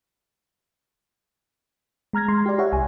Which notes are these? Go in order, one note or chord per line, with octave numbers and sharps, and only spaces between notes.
G#3 A#5 F6 G#6 A#6
G#3 C6
G4 D5
G4 C#5 E5 F#5
C2 G#5